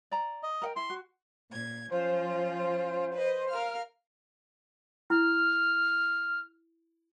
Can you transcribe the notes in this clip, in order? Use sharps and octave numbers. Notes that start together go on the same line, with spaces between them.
D5 A#5
D#5
A#4 F#5 G5
E4 C6
F#4
A#2 G#6
F3 C#4 F4 C5
B4 D#5
A#4 F5 F6
E4 F6